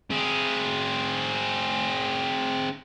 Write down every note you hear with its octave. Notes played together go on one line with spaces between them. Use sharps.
C4 G#4